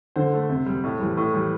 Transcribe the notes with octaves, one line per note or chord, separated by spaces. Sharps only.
D3 C5
A3
C3
G3
A2
E3 G3
A2
E3 G3